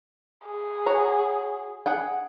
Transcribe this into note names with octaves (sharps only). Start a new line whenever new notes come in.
G#4
F#4 C#5 A#5
G#4 F#5 G5